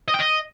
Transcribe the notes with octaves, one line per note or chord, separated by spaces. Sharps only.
D#5
G5
D#5